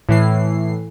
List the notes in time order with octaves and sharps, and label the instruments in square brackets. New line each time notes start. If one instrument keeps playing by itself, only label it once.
[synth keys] A2 E3 C7